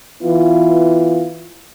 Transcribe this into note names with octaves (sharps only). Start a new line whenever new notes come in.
E3 B3 E4 F4